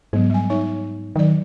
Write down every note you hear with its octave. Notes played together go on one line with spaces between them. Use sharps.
G#2 F#3 B3
G3 G#5
D#4 C#5 E5
D#3 F#3 D5